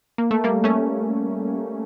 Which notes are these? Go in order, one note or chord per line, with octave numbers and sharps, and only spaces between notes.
A#3
A3
G3 A#3
A3 C#4